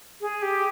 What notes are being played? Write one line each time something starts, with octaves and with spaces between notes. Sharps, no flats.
G#4
G4